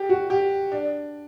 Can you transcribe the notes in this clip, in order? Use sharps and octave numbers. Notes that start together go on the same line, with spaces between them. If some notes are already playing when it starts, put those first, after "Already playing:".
Already playing: G4
F#4
G4
D4